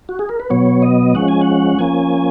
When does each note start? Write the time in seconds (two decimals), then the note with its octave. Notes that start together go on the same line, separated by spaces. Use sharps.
0.09 F#4
0.19 G#4
0.29 A#4
0.40 B4
0.50 B2 F#3 B3 C#5
0.82 D#5
1.15 F3 G#3 C#4 F#5
1.28 G#5
1.41 F#5
1.79 F3 A#3 C#4 G#5